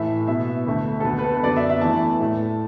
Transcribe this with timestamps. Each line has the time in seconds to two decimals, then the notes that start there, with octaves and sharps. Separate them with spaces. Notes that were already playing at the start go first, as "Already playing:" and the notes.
Already playing: A2 E3 A3 E5
0.27 B2 B3 E5
0.66 D2 D3 A3
1.00 A4
1.04 D2 D3 B3 B4
1.19 B4
1.24 A4
1.34 B4
1.43 F#2 D3 B3 D5
1.56 E5
1.69 E5
1.81 E2 E3 A3 A5
2.20 A2 A3